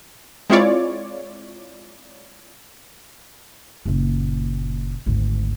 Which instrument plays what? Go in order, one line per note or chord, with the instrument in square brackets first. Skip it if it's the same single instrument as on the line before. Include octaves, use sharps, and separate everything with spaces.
[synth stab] G#3 C4 E4 F4 C#5 D5
[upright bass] F#1 A#2
G#1 D2